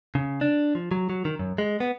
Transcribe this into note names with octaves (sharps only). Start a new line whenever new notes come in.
C#3
D4
F3
F#3
F#3
D#3
F#2
G#3
B3